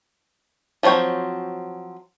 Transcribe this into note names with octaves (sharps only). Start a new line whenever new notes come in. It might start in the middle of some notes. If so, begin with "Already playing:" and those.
F3 F#3 C4 C#5 G5